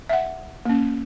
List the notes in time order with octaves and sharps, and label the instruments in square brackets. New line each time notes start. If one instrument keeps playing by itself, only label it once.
[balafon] E5 F#5
A#3 C#4